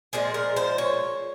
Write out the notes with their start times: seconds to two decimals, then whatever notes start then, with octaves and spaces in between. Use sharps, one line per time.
0.13 A#2 F3 G#3 G#4
0.34 A#4
0.56 C5
0.78 C#5